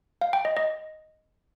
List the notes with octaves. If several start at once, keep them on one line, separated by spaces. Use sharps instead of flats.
F5
G5
D#5
D#5